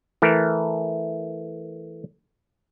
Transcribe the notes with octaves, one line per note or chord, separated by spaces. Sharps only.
E3 A3 A#4